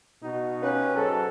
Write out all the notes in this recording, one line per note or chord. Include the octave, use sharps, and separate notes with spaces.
B2 D#4 F#4
C#4 F4 G4 B4
G#2 F#3 A4